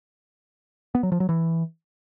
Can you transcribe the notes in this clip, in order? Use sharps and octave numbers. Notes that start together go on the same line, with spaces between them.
B3
F#3
F3
F#3
E3